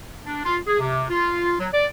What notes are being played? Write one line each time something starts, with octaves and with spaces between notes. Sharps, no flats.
D4
F4
G#4
C3
F4
F#3
D5